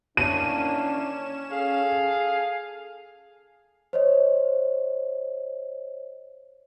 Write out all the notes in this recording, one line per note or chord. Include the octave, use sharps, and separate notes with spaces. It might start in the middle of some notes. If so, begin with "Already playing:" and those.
D#3 E3 A#3 C#4 D4 D#7 E7
G#4 A4 F5
C5 C#5 D#5